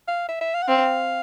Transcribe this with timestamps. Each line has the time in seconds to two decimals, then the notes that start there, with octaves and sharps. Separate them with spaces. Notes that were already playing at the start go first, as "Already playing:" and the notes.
0.08 F5
0.29 E5
0.41 E5
0.54 F5
0.62 F#5
0.68 C4 F5